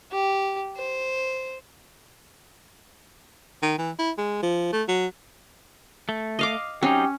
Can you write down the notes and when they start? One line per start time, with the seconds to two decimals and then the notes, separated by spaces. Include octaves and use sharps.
0.12 G4
0.77 C5
3.63 D#3
3.78 E3
3.99 E4
4.18 G#3
4.43 F3
4.73 A3
4.88 F#3
6.09 A3
6.39 D#5 F5 D6
6.83 F#3 C4 C#4 D#4 G4